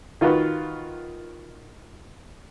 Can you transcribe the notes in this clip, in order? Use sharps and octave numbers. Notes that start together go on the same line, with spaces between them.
D#3 F4 F#4 B4